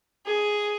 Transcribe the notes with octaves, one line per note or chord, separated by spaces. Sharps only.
G#4